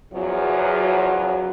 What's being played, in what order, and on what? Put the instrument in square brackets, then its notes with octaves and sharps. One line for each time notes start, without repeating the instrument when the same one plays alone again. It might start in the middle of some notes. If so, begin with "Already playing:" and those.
[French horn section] E2 C#3 F3 F#3